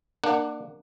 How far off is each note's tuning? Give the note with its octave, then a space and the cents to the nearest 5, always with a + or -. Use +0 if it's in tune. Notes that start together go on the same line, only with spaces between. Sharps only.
A#3 +0 D4 +25 F#5 +0